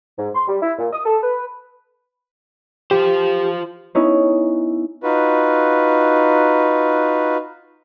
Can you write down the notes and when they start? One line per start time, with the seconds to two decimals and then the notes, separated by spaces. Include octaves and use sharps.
0.18 G#2
0.35 C6
0.47 G3
0.62 E4
0.78 A#2
0.92 D#6
1.05 A4
1.22 B4
2.91 F4 G4 C5
3.95 B3 C#4 D#4 E4 C#5
5.03 D#4 F4 F#4 B4